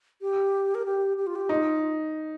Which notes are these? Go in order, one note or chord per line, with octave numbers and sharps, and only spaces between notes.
G4
A#4
G4
G4
F4
G4
D#4 F4